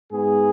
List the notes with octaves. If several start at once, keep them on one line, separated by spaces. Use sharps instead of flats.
G#2 G#3 B3 G#4